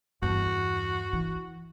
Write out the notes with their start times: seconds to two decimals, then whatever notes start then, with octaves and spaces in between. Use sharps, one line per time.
0.22 E2 G2 F#4
1.13 E3